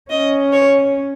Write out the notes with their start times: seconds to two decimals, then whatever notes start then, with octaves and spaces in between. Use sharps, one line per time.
0.10 C#4 D#5
0.53 C#5